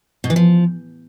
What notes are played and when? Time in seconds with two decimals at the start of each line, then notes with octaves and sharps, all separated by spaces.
0.24 B2
0.30 E3
0.36 F3